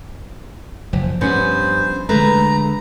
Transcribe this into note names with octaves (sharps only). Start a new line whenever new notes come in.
F#1 F3
G2 B3 C#4 C5
D3 G#3 A3 B4 A#5